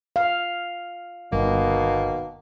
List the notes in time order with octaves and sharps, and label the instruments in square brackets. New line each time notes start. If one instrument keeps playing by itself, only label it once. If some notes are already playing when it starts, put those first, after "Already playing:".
[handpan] F5
[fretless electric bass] G1 [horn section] B2 D#3 A#3